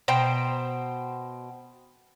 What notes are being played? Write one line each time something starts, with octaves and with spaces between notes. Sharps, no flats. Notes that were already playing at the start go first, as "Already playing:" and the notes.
B2 C5 G5 A#5